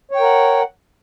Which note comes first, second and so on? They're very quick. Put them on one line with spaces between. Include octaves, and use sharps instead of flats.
C#5 G5 A#4 F#5